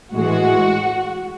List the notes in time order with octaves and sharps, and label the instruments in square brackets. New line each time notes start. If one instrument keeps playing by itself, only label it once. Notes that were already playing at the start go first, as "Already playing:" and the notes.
[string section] A2 E3 G#3 F#4